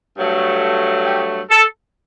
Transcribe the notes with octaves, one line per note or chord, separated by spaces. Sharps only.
G2 F#3 A3
G4
A4